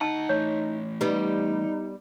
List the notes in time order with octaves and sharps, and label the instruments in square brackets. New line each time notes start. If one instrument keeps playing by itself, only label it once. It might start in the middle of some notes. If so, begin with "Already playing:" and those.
[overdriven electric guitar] D2 F#5 [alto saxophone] D#4 [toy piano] A5
[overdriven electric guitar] E3 A3 [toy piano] C#5
[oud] G3 B3 [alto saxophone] D#4